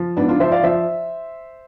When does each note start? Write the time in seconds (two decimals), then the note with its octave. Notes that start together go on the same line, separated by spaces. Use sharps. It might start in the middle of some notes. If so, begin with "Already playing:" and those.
Already playing: F3
0.17 G#2 B3 D4
0.28 D4 F4
0.40 F3 C5 E5
0.51 D5 F5
0.63 F3 C5 E5